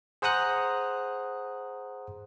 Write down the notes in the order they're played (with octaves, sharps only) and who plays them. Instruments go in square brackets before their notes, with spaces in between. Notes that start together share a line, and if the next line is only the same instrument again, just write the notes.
[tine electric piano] G#4 C5 F#5 A#5 D#6 F#6